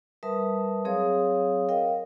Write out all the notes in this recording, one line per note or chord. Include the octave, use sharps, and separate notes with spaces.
G3 A#4 B4 E5 A5 D#6
F#3 C4 G#4 C#5 F5 D#6
A#4 D#5 F5 G5